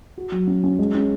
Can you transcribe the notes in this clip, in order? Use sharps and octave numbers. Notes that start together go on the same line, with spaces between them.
F#4
F#3
C#4
C#4
G#3
C#4